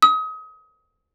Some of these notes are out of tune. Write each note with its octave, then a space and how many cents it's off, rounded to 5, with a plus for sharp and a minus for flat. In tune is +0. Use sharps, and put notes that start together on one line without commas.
D#6 +30